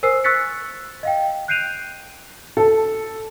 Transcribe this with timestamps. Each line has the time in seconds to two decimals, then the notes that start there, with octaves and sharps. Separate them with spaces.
0.03 A#4 C5 G#5 E6 C7
0.24 C#6 E6 F#6 A6 B6 C#7
1.03 D#5 F5 G5
1.48 F#6 G6 C7 D7 D#7 F7
2.57 A4